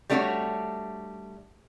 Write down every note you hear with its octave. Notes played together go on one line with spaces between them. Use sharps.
G3 A3 D4 F#4 G#4 C#5